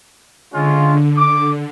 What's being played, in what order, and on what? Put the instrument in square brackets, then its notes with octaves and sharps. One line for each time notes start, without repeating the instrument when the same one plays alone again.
[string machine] D3 [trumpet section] G#3 C#4 F4
[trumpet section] D6